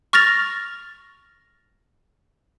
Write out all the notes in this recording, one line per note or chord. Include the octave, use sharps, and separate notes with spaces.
C#6 F6 A6 A#6 F7